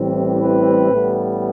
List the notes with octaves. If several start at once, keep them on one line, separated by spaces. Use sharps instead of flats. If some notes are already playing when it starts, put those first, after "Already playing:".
Already playing: A1 A2 E3 G3 C4
B4
A1 A2 G3 B3